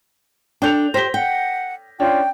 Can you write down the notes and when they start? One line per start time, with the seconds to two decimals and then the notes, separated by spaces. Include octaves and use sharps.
0.62 D4 A4 G5 G6 F7
0.94 G4 C5 G5 A#6 B6 G7
1.14 F#5 G5
2.00 C#4 D4 F4 G5